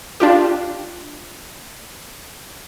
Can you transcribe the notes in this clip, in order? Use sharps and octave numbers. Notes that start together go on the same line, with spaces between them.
D4 F4 G4